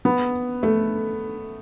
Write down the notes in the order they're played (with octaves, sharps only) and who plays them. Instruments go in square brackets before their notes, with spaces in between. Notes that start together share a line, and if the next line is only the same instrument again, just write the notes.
[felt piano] B3
A3